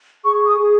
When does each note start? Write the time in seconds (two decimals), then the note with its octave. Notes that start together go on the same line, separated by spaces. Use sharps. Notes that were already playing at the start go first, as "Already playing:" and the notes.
0.24 G#4 C#6
0.48 D#6
0.60 G#4